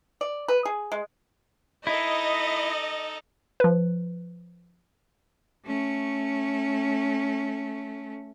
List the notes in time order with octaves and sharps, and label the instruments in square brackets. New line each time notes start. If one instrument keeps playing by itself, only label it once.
[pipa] D5
B4
G#4
G#3
[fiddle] D#4 A4 [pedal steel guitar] E4 [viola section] D#5
[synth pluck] F3 B4
[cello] A3 C#4